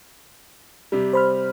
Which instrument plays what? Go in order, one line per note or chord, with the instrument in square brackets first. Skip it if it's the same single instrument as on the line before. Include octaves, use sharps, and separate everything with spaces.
[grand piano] C3 G3
[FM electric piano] C5 B5 F6